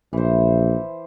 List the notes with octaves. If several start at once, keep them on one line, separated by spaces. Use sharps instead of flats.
A#1 E3 C5